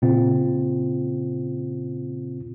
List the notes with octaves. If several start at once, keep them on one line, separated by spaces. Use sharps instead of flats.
A#2 C#3 C4 F4